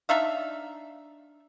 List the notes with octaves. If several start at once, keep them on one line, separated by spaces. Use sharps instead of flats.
D4 D#4 E5 F5